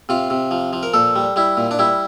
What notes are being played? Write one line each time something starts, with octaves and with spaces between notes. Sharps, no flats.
C3 F4
C3
F3
F3
A#4
A#2 A4
G3
G3 E4
A#2
D4
G3 E4